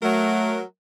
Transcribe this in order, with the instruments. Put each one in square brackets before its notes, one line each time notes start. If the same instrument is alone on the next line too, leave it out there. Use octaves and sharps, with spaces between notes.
[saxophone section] F#3 A#4 [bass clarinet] A3